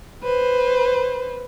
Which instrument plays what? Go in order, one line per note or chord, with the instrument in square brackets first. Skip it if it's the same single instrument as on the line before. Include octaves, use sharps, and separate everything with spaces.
[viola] B4 C5